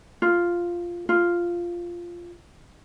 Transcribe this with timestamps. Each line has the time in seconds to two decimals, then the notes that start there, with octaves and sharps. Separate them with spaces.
0.22 F4
1.09 F4